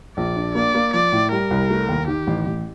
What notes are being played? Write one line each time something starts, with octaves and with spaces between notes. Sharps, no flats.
A#1 D5
D4
A#3 D5
A#3
F3 D5
A2
G3 A#4
C2
A3
D#2
D#3 G4
A1
A1